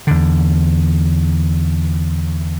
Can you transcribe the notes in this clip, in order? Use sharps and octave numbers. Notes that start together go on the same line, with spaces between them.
E2 D3